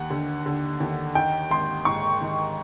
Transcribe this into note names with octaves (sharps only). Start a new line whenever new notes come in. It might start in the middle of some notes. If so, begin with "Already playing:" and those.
Already playing: D#2 F#5
D3
D3
D#2
D#3 G5
G#1 C6
G#2 C#6
D#3